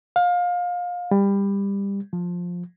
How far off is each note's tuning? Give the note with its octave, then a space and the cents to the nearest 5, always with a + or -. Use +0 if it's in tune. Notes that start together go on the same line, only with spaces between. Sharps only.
F5 +25
G3 +20
F3 +10